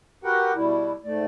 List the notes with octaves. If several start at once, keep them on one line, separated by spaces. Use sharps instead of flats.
F#4 G4 A#4 B4 F#5 G5
B2 G3 E4
G#2 A3 D5